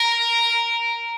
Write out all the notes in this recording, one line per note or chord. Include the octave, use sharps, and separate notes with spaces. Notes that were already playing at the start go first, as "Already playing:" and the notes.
Already playing: A#4